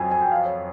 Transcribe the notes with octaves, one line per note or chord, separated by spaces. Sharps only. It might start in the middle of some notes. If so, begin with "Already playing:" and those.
Already playing: F2 F#3 G5 G#5
G#5
G5
F5
C#5